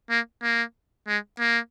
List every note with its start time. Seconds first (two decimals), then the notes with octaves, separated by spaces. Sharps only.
0.10 A#3
0.43 A#3
1.08 G#3
1.39 A#3